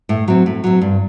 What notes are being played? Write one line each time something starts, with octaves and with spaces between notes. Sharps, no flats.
A2
F#3 C4
A2
F#3 C4
G2